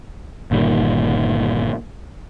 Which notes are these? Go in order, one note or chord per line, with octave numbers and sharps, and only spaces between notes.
G1 A#2 D#3 G3